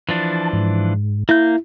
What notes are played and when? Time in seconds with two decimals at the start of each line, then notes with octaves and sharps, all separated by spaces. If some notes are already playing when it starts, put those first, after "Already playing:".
0.09 E3 F3 D4 A5
0.53 G#2
1.29 A#3 E4 G6